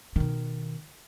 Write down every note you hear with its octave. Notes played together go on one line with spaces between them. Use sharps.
B2 D#3